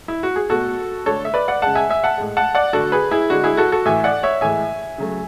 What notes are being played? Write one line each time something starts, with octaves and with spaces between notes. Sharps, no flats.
E4
F#4
G#4
B2 A3 F#4 A4
D3 A3 A4 C#5
E5
B4 D5
D5 F#5
C#3 G#3 F#5 A5
E5 G#5
E5 G#5
F#5 A5
A2 G#3
F#5 A5
D5 F#5
D3 A3 F#4 A4
G#4 B4
E4 G#4
D3 G#3 F#4
E4 G#4
F#4 A4
F#4 A4
A2 E3 A3 E5 G#5
D5 F#5
C#5 E5
A2 E3 G#3 E5 G#5
C#3 F#3 A3